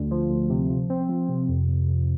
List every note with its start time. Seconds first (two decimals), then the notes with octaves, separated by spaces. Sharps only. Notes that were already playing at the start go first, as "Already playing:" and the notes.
Already playing: D2 D3
0.11 F3
0.30 D2
0.50 C3
0.69 F3
0.90 C4
1.09 F3
1.29 C3
1.48 F2
1.68 F2
1.88 F2